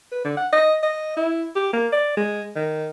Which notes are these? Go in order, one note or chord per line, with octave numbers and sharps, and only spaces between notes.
B4
D3
F#5
D#5
D#5
E4
G4
A#3
D5
G#3
D#3